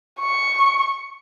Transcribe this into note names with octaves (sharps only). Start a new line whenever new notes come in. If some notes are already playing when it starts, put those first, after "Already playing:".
C#6